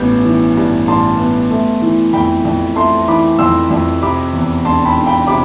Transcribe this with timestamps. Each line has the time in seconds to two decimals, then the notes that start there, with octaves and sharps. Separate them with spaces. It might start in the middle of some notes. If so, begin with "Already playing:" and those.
Already playing: A1 G2 E3 B3 G6
0.25 E3
0.57 G2
0.88 A1 A5 C6
1.19 B3
1.50 A3
1.82 E3
2.13 F2 G5 B5
2.45 F2
2.76 A3 A5 C6
3.08 E3 B5 D6
3.39 F2 C6 E6
3.71 F2
4.02 C3 B5 D6
4.33 E2
4.65 E1 A5 C6
4.85 G5 B5
4.97 E1
5.07 G5 B5
5.27 C3 B5 D6